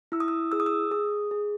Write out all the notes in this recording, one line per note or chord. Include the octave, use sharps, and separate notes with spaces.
E4 E6
D#6
E6
G#4 E6
D#6
E6
G#4 D#6
G#4